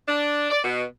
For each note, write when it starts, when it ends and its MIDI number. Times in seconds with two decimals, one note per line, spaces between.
0.08 0.48 62
0.50 0.59 74
0.64 0.84 47